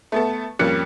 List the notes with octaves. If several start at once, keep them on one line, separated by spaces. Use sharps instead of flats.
A3 B3 A4
F2 G3 A#3 C#4 F#6 C#7